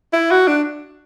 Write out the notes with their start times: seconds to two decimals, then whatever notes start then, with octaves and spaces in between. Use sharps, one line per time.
0.13 E4
0.31 F#4
0.47 D4